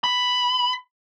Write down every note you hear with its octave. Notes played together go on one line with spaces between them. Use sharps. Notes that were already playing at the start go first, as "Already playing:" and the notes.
B5